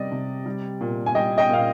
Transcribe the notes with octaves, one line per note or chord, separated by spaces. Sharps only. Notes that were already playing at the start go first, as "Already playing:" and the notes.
Already playing: C3 G3 D5 D#5
C3
G3
A#2
G#5
G3 D#5 G5
D#5 G5
A#2 F5